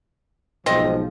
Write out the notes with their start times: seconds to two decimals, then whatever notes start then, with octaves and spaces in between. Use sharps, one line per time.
0.66 B1 G#2 F3 C4 D#5